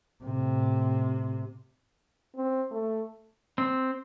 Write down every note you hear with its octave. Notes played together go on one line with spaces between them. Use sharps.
A2 C3
C4
A3
C4